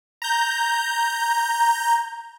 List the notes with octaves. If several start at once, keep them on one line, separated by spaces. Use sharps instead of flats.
A#5 G6